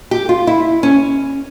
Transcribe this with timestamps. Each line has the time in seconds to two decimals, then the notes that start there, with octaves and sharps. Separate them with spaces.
0.11 G4
0.29 F4
0.47 E4
0.83 C#4